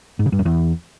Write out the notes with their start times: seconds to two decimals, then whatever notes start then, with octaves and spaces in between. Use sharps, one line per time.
0.19 G#2
0.26 C#3
0.32 G2
0.39 F#2
0.45 E2